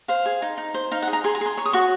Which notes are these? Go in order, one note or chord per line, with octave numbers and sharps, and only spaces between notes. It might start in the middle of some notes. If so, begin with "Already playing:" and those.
C5 F5
G#4
D#4
D#4
C5
D#4 F5
F#5
G#4
A#5
G#4 C6
A#5
G#4 C6
C#5 C#6
D#6
F#4 C#6